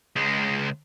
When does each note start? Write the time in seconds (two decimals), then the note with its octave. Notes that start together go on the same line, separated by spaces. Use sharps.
0.16 C#2 G#3